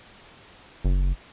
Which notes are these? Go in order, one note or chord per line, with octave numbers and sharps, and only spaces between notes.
F#1